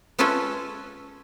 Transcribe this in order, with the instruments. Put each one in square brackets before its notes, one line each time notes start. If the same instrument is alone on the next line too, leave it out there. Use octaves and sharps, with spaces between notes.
[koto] G#3 C#4 F4 A4 B4 E5